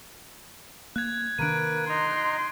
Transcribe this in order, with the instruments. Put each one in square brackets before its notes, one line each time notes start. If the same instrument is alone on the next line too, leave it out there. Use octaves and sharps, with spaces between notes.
[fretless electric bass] A#3 [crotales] F#6 G#6
[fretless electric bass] C3 D#3 D4 [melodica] A#3 B4 [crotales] D7 D#7
[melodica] D#4 A#5 [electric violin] C6